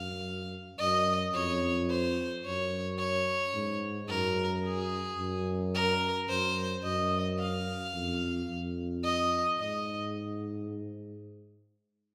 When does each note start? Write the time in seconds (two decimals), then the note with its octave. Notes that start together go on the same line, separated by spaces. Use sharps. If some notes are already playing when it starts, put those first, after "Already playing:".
Already playing: F#2 F5
0.79 F#2 D#5
1.34 F2 C#5
1.90 C5
2.44 F#2 C#5
2.99 C#5
3.54 G#2
4.08 F#2 A#4
4.65 G#4
5.19 F#2
5.74 A#4
6.29 F#2 C5
6.83 F#2 D#5
7.39 F5
7.94 F2
8.49 F2
9.04 D#5
9.59 G#2 D#5